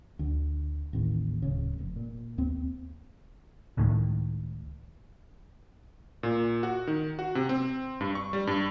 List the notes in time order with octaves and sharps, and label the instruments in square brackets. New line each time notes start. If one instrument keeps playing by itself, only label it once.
[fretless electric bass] D2
A1 D#2
D1 C#3
F1
A#2
D#2 C4
[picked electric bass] C#2 A2 D#3
[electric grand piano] A#2
F#4
D#3
F#4
C3
C4
G2
C#6
G3
G2